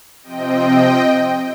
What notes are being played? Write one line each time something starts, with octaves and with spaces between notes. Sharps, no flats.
C3 F3 C4 D#5 G5